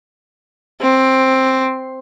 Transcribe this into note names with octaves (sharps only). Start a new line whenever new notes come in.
C4